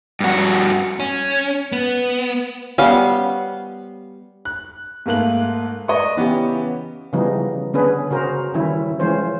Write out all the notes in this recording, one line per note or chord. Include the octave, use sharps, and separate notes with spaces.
G2 F#4
C#4
B3
G3 B3 C#4 C5 F5
F#6
G#2 A3 A#3 F#6 F#7
D5 D#5 A#5 C#6
C#3 E3 B3 C#4 E4 G4
C#3 E3 F3 G3 B3 D#4
D3 B3 C#4 D4 G#4 B4
C#3 C#4 F#4 A#4 C5
D#3 E3 G3 C#4 E4
E3 F3 G#3 C#4 C5 C#5